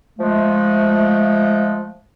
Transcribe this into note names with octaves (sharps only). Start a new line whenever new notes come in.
F3 G#3 A3